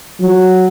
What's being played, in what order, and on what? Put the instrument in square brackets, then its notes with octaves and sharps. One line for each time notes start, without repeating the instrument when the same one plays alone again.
[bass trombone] F#3